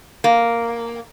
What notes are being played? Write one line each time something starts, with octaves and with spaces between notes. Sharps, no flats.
A#3